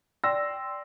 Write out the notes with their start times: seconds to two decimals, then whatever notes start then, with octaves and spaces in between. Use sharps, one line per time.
0.24 D5 G5 C6 E6 A#6